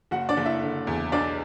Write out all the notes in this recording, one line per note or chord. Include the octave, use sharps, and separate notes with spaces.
F#1 F#4 F#5
D4 D5
F#1
E4 E5
D3
E2
B1 D4 D5